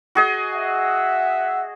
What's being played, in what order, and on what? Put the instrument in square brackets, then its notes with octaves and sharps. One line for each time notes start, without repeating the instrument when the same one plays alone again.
[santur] F#4 G#4 D#5
[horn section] E5 F#5